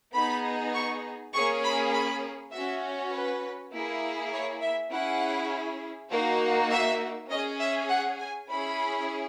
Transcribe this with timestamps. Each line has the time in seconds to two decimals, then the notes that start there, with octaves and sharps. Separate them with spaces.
0.14 B3 D#4 G#4 B5
0.73 C#6
1.33 A#3 C#4 G#4 C#6
1.63 B5
1.93 B5
2.52 C#4 F#4 E5
3.12 B4
3.72 A#3 E4 G#4
4.32 C#5
4.61 E5
4.91 C#4 E4 G#4 F#5
6.10 A#3 D#4 F#4
6.70 E5
7.29 C#4 G#4 D#5
7.60 E5
7.89 F#5
8.19 G#5
8.49 C#4 E4 G#4 B5